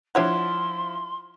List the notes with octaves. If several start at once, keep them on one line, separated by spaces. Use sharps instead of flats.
F3 D4 E4 F4 C#5 F#5 C6